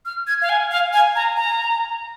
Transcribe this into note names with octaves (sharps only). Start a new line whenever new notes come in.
F6
G#6
F5
G#5
F5
G#5
A#5
A#5